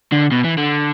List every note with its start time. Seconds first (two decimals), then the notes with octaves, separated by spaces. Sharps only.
0.12 D3
0.32 B2
0.44 E3
0.58 D3